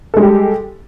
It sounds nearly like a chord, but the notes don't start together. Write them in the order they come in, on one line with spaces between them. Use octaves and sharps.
A4 G#3 G3 G4